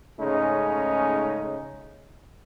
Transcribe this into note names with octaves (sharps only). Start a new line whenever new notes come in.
G#2 C#3 G#3 A3 C#4 D#4